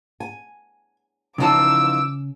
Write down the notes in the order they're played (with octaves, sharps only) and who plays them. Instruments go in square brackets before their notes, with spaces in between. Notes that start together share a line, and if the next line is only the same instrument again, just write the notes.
[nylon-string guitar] G#5
[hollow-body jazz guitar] C#3 A5 [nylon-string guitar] E3 F3 D#4 [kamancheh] D6 E6